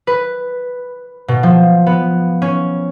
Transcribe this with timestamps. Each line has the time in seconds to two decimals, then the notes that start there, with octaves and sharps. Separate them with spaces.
0.07 B4
1.28 B2
1.43 F3
1.86 B3
2.42 C#4